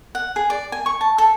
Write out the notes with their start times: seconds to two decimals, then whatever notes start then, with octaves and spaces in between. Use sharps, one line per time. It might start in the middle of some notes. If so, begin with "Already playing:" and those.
0.15 F#5
0.36 G#4
0.50 D5
0.72 G#5
0.86 C#6
1.01 A5
1.18 A4